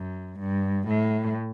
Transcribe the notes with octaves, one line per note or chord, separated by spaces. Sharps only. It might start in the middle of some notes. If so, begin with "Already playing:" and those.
Already playing: F#2
G2
A2